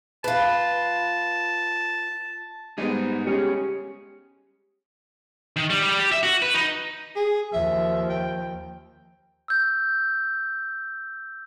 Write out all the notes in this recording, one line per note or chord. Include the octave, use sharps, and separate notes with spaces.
F4 B4 A5
G3 G#3 B3 D#4 G#4 D#5
C#4 G4 G#4
D#3
G3
G3
G4
E5
F#4
B4
D#4
G#4
D#2 F3 E5
G5
E6 G6